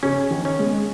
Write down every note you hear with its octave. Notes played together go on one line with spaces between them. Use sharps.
C#3 C#4
D#3
C#4
G#3